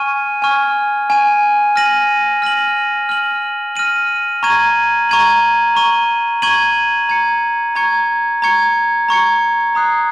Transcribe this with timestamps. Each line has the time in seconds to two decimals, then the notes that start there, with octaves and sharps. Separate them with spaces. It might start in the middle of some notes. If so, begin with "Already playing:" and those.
Already playing: G#5 C#6 F6 G#6 D#7
0.42 G#5 C#6 F6 G#6 D#7
1.09 G#5 C#6 F6 G#6 D#7
1.76 F6 A#6 D#7 F#7
2.42 F6 A#6 D#7 F#7
3.09 F6 A#6 D#7 F#7
3.76 F6 A#6 D#7 F#7
4.43 A#5 C#6 G#6 D#7 F#7
5.09 A#5 C#6 G#6 D#7 F#7
5.75 A#5 C#6 G#6 D#7 F#7
6.42 A#5 C#6 G#6 D#7 F#7
7.09 A#5 C#6 G#6 C#7
7.75 A#5 C#6 G#6 C#7
8.42 A#5 C#6 G#6 C#7
9.09 A#5 C#6 G#6 C#7
9.75 A#5 D#6 F#6 C7